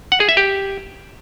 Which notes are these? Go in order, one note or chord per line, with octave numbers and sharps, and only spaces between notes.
F#5
G#4
E5
G4